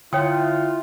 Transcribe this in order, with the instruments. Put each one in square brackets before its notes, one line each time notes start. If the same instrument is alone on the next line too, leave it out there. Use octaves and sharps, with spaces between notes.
[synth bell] D3 G6 [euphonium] E4 [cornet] F4 [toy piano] C#5 G5 D#6